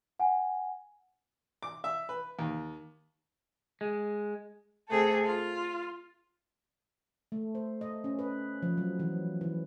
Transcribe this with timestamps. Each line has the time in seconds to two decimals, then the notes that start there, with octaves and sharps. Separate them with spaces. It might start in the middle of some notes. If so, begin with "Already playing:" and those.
0.19 F#5 G#5
1.63 D6
1.84 E5
2.09 B4
2.39 D#2
3.81 G#3
4.87 C3 A3 G#4 A4
5.24 F4
7.32 A3
7.55 C5
7.81 D#5
8.04 C#4
8.19 B4
8.62 F3
8.77 F#3
8.99 E3
9.41 E3